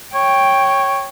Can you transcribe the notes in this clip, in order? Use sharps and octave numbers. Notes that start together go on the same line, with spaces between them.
C#5 G5